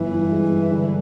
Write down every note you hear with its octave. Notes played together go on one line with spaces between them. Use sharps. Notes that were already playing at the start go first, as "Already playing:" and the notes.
Already playing: G1 E3
G2
G#3
G2
D3